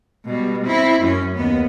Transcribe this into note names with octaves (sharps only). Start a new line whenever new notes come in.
B2 G3
C4 E4
F#2 C#4
D#2 B3